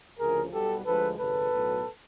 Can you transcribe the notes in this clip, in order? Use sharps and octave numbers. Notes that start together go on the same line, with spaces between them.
D2 C#3 F3 G#4 A#4
B1 B2 G3 B3 G4 A4
D2 D3 F3 G#3 A4 B4
G#1 F#2 C#3 A4 B4
B1 A2 F#3 B3